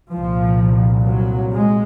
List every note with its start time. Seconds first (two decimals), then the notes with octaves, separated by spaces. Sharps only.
0.12 C2 A#2 F3
1.07 F#3
1.54 G#3